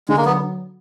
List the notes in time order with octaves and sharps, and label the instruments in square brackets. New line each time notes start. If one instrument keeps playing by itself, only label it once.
[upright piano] D3 [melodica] G#3
[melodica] A#3
[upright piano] F#3 [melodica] B3